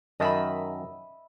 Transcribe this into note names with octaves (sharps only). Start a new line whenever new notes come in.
F#2 D#3 D#5 E5 A5 B5